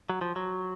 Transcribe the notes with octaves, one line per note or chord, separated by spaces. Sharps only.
F#3
F3
F#3